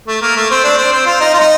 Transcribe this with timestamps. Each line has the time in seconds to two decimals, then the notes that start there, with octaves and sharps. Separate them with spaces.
0.07 A3
0.22 A#3
0.36 A3
0.50 C4
0.64 D4
0.77 C4
0.92 C4
1.06 F4
1.20 D#4
1.33 F4
1.39 D#4